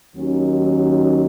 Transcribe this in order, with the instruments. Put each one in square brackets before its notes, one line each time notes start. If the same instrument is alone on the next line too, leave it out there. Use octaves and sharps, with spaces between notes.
[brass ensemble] D#2 D#3 F#3 C#4